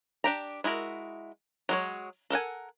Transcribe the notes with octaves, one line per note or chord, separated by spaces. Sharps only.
D4 G4 A#5
G#3 E4 F#4 A#4
F#3 G#3 C#5
A4 A#4 F#5 G#5